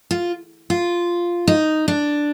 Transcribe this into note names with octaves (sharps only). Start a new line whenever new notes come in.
F4
F4
D#4
D4